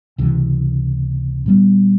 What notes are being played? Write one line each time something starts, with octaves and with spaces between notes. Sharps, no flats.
C#2 C3 E3
A#2 G3 B3